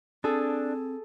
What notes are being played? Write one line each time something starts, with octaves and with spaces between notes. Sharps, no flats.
C4 D4 G#4 A4